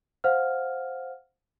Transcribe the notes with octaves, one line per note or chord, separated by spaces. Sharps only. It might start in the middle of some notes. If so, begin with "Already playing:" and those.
C5 F5 F#5 F6